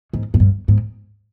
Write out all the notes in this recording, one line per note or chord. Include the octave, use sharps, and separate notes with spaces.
G#2
G#2
G2
G#2